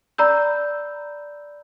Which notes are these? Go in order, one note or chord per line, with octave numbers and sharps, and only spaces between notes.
D5 A#5 B5 E6 G6